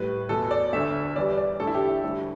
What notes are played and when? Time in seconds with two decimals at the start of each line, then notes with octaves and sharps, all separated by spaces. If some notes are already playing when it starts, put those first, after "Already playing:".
Already playing: A2 G3 B4
0.29 E2 B2 A3 A4
0.51 D5
0.73 D2 D3 A3 E5
1.16 E2 E3 G3 D5
1.38 D5
1.60 E2 D3 A3 A4
1.67 E4
1.74 G4
1.89 E4
2.03 D2 D3 G3 E4